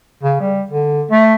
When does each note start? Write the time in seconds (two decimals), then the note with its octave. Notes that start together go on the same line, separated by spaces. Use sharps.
0.23 C#3
0.40 G3
0.69 D3
1.11 A3